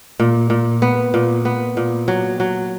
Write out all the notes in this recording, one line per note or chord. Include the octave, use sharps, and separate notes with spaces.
A#2
A#2
B3
A#2
B3
A#2
F#3
F#3